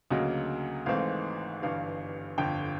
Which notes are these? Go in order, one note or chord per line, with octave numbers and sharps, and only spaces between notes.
D2 C#3 F#3 A#3 D#5
G#1 G#2 E3 A3 C4 F5
G1 G2 E3 F5
G1 F2 D3 G5